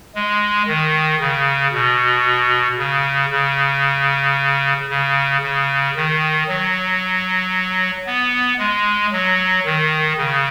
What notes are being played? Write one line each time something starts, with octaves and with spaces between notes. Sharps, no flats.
G#3
D#3
C#3
B2
C#3
C#3
C#3
C#3
D#3
F#3
B3
G#3
F#3
D#3
C#3